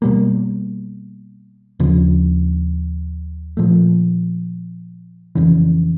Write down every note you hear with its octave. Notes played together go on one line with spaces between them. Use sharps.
B2 G3 A#3
D#2 C#3 F3
A#2 F3 A3
F2 C#3 E3